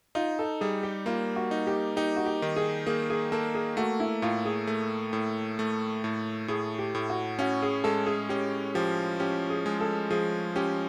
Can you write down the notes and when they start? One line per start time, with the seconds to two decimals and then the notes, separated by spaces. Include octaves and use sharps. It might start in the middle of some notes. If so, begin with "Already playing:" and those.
0.15 D#4 F4
0.39 A4
0.61 G3 G#4
0.83 G4
1.06 A#3 F4
1.36 F#4
1.51 D#4
1.67 G4
1.96 D#4 G4
2.17 F#4
2.26 G4
2.42 D#3
2.56 G#4
2.87 A#3 G#4
3.10 G#4
3.32 A#3 A4
3.54 G#4
3.77 A3 F#4
4.00 E4
4.22 A2 F4
4.45 G#4
4.67 A3
5.13 A2
5.59 A3
6.04 A2
6.48 A2 G#4
6.79 G4
6.95 A2
7.10 F#4
7.39 C#4 F#4
7.62 G#4
7.84 G#3 A4
8.06 G#4
8.29 C#4 G4
8.75 F3 G4
9.20 C#4 G4
9.50 G#4
9.66 G#3
9.80 A4
10.10 F3 G#4
10.56 C#4 G4